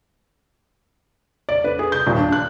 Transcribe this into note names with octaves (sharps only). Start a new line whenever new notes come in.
D5
B4
G#4
G6
D#1
D4
F#6